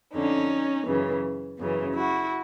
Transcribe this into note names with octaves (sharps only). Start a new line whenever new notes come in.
F2 D3 C#4 D#4
F#2 C#3 E3
F#2 C#3 E3
E4 F#4